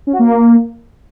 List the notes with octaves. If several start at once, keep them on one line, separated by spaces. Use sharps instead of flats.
C#4
F#4
A#3